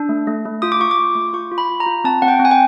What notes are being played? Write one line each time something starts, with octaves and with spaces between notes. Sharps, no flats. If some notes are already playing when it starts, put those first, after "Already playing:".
Already playing: D4
A3
A3
A3
F4 D#6
D6
F4 C#6
D6
F4
A3
F4 C#6
F4
B5
F4
A#5
F4
C4 A5
C4 F#5
G5
C4
G#5
G5